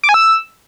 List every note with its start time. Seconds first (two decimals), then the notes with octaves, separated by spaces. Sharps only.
0.04 D6
0.09 G#5
0.14 E6